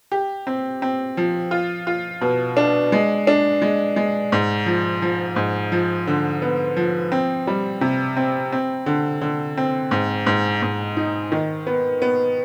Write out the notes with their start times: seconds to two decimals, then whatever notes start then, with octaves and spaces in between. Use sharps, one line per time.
0.12 G4
0.47 C4
0.82 C4
1.17 F3
1.51 F4
1.87 F4
2.21 B2
2.57 D4
2.92 G#3
3.27 D4
3.62 G#3
3.96 G#3
4.32 G#2
4.66 F3
5.02 F3
5.36 G#2
5.72 F3
6.07 D3
6.42 B3
6.77 F3
7.12 C4
7.47 G3
7.81 C3
8.17 C4
8.52 C4
8.86 D3
9.21 D3
9.57 C4
9.91 G#2
10.27 G#2
10.62 G#2
10.97 D#4
11.32 D#3
11.67 B3
12.02 B3